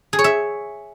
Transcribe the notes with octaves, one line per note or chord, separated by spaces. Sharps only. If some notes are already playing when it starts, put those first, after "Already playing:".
G#4
C#5
E5